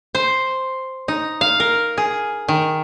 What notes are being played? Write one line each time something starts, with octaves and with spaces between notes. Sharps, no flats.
C5
D#4
F5
A#4
G#4
D#3